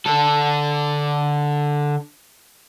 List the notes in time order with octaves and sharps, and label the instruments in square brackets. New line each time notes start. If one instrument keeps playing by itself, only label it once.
[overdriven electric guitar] D3 A4